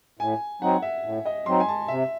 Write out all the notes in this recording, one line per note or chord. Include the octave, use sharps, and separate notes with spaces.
A2 G#5
F#3 C4 D#4 F#5
E5
A2
D#5
F#3 C4 D#4 C6
G#5
A5
C3 E5